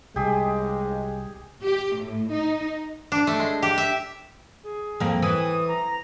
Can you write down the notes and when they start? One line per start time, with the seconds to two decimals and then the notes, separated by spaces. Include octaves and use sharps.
0.16 C2 G#3 G4 G#4
1.62 G4
1.96 A2
2.31 D#4
3.12 D4
3.27 A3
3.39 G#3
3.62 G4
3.78 E5
4.63 G#4
5.00 F2 A#3
5.22 E3 D#6
5.68 A#5